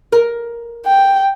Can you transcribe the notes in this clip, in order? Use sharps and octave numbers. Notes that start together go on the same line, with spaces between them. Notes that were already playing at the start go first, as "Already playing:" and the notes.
A#4
G5